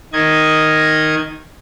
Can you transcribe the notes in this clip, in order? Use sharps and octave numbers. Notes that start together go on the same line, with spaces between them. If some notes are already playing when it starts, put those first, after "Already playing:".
D#3 D#5 G#6